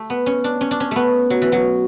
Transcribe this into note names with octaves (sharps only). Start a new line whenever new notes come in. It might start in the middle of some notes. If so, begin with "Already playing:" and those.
Already playing: A3
B3
C#4
D4
C#4
D4
C#4
A3 B3
F#3
E3
F#3